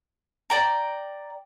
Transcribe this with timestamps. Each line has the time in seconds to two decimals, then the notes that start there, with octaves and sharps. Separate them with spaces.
0.50 D5 G5 A#5